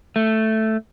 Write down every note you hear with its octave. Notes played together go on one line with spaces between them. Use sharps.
A3